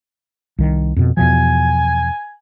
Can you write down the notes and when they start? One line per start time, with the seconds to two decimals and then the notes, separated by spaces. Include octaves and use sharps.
0.58 C2 D#3
0.96 F2 B2
1.17 E2 B2 F3 G#5